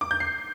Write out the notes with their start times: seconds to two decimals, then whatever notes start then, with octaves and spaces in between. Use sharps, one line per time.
0.01 D6
0.11 G6
0.20 C7